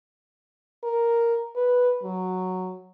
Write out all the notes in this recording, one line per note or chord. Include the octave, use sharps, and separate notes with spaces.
A#4
B4
F#3